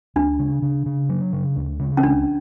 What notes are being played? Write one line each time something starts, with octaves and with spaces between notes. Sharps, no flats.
D2 D4
C#3
C#3
C#3
F#3
C#3
D2
C#3
C#4
C#2 D4